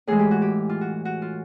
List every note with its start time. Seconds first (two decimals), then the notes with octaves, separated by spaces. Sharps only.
0.07 A2 E3 G#3 G#4
0.19 G4
0.31 F#4
0.42 G4
0.69 F4
0.81 F#4
1.05 F#4
1.22 F4